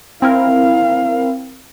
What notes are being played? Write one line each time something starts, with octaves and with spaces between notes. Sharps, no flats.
C4 E4 A#4 F5